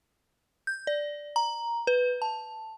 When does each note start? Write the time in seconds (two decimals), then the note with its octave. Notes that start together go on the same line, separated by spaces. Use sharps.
0.67 G6
0.87 D5
1.36 A#5
1.87 B4
2.22 A5